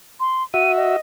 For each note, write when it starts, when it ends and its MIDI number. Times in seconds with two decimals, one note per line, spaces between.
0.20 0.43 84
0.54 0.96 66
0.54 0.96 76
0.54 0.72 99
0.77 1.00 75